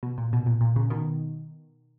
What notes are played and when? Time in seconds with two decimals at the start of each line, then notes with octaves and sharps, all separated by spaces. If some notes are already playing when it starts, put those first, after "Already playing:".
0.03 B2
0.18 A#2
0.33 B2
0.46 A#2
0.61 A#2
0.76 A#2 C#3
0.90 B2 D#3